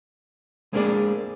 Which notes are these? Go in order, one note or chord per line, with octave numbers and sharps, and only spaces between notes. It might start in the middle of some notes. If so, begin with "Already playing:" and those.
G#3 A#3 C4 D4 G#4 D5